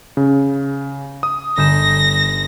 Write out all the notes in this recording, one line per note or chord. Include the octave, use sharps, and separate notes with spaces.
C#3
D#6
G1 G6 A#6 E7